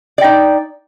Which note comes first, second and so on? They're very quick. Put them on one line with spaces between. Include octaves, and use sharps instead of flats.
D5 G5 D#4